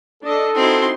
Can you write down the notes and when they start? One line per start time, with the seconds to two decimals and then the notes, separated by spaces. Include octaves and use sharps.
0.23 D4 A4 D#5
0.55 C4 D#4 E4 F#4 C6